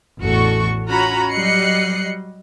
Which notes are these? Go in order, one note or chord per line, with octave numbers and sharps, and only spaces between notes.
A1 E2 F#4 A4 C#6
C#4 F4 F#4 A#5 B5
F#3 G3 D#5 F#6 C7 C#7